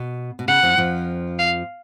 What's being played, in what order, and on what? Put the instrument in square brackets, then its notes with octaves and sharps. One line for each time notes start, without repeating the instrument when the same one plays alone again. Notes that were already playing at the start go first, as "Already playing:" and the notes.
Already playing: [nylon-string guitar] B2
B2
[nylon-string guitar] C#3 [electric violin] F#5
[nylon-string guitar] F2 F3
F2 F3
[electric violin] F5